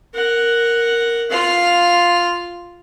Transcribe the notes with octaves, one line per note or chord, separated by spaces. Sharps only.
A#4 F#5
F4 F5